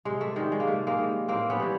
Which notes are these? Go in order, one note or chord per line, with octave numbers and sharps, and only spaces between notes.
C3 G#3
A3
D#3 G3 G#3
G#3
A#3
C3 A3
G#3 A#3
D#3 G3
A2 A#3 C4
B3 C#4
E3 G3